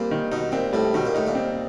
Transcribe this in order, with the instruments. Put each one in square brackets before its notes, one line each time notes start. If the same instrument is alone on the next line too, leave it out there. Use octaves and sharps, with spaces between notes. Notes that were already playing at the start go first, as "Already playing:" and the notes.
Already playing: [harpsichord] A#2 [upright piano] G3 C4
[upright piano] D#3
[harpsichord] B2 [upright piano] D#4
[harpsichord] A#2 [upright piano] C4
[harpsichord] A2 [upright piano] G3
[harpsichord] B2 [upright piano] D#3
[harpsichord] A#2
[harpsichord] A2 [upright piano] D#4
[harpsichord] A#2
[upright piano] C4